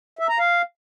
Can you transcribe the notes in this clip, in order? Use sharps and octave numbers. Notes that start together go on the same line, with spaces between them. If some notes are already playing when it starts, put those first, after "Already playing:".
E5
A#5
F5